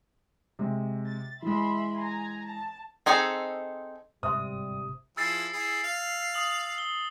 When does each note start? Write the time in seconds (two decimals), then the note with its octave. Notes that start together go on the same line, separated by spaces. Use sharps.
0.59 C3 G#3
1.06 A6
1.42 E3 G#3 E5 B5 C6
1.98 G#5 A#5
2.47 A5
3.06 C4 D#4 G#4 A4 C5
4.23 G1 G#2 C3 G3 C5 E5 C6 D#6
5.17 F3 E4 G#4 E6 A6 C7
5.53 E4 G#4
5.84 F5
6.34 D#6 F#7
6.78 G7